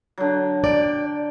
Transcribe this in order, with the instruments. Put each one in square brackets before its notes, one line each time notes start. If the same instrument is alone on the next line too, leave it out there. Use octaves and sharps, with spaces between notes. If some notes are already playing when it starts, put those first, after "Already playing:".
[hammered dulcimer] D3 F#3
[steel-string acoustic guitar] D5 [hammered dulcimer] G5